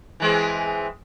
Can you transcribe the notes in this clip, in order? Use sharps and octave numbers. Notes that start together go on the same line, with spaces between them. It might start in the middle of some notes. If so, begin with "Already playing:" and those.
E3 G#3 C4